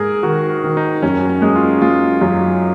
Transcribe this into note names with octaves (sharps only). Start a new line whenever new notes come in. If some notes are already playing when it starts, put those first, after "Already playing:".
Already playing: G#2 A#3 G#4 A#4
D#3 F#4
D#3
D#4
F#2 C#4
C#4
G#3
F4
G#3 F4
F#2